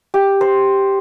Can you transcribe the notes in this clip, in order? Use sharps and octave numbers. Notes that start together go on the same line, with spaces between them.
G4
C5